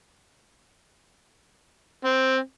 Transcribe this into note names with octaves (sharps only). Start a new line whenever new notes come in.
C4